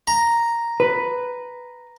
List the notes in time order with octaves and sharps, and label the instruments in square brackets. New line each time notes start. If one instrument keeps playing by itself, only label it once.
[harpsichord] A#5
[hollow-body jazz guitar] B4